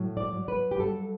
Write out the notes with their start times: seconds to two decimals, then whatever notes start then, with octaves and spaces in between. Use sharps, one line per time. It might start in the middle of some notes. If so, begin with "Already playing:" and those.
Already playing: A2 F#3
0.17 D5
0.33 F#3
0.48 B4
0.71 G4
0.80 G2 A4